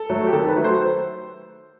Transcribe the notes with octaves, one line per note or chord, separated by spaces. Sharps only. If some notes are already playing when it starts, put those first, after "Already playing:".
Already playing: A4
F#3 A3
G4
D#3 A4
B4
F#3 A3
C5